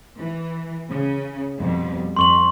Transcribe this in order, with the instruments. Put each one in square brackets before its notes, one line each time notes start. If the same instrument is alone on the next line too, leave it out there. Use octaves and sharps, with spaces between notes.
[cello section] E3
C#3
F2 B2 G3
[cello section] F2 [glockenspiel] C6 C#6 F#7